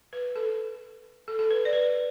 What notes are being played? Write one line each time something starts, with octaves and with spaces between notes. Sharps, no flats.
B4
A4
A4
A4
B4
D5
B4